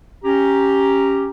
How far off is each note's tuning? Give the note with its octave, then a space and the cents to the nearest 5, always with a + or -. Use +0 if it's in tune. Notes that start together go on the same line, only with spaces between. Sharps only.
C#4 +0 G4 +0 A#5 +0